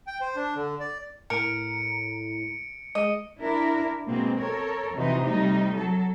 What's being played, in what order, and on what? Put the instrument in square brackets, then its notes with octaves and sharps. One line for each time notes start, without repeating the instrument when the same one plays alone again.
[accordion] G5
C5
D4
D3
D5
[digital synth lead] A2 [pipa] A#4 [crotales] C#7 D7
[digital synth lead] G#3 [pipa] D#5
[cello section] D4 E4 A#4
B2 G#3 A#3 C4
A4 A#4 C#5
F2 C3 E3 D#4 F#4 C5
C3 G3 A3 D#4
F#3 A4